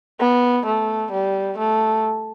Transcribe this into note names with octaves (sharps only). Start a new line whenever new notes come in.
B3
A3
G3
A3